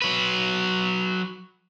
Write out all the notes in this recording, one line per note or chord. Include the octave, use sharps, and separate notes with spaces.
F#3 B4